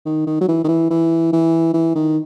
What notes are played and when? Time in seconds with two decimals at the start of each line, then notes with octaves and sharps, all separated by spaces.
0.06 D#3
0.27 D#3
0.41 F#3
0.48 E3
0.64 D#3
0.69 E3
0.90 E3
1.33 E3
1.74 E3
1.95 D#3